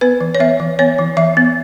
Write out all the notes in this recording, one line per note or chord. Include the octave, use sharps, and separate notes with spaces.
B3 B4
E3
C#5
B3 E5
E3
B3 C#5
E3
E3 E5
B3